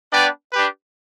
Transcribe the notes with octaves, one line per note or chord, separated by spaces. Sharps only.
B3 D4 B4 D5 G5
D4 G4 B4